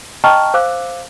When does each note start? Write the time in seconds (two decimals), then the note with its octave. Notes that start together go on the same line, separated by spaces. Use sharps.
0.24 D#5 G5 A5 A#5 C#6 F6
0.54 C5 F5 D6 E6 F#6